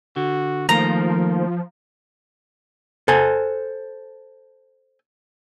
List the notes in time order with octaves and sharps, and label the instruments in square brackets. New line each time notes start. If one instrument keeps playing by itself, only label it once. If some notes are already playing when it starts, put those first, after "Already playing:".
[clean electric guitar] D3 [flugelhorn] F#4
[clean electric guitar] D#3 A3 A#3 [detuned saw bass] F3 [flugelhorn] A#4 [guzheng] A#5
[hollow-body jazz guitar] A4 C5 G#5